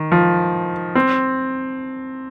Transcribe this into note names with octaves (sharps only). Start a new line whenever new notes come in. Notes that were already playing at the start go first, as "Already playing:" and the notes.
Already playing: D#3
F3
C4